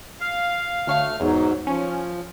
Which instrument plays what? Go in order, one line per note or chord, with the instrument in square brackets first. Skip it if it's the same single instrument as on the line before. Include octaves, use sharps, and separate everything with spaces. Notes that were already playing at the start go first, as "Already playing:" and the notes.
[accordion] F5
[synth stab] D2 C#5 F5 [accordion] A3 F6
[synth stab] E2 [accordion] G#2 F#3
[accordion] F3 [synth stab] C#4